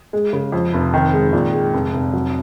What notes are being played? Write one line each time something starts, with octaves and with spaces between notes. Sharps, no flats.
G#3
C#3
F2
F1
D#3
G#3
A#2
G#3
F1
F1
F#3